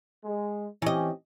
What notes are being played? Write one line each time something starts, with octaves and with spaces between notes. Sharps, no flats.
G#3
E3 C4 C#4 G4 D#5